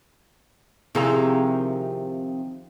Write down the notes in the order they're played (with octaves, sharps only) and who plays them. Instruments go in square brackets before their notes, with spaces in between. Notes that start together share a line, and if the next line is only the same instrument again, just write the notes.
[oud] C3 D#3 F3 [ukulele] E4 G#4 A#5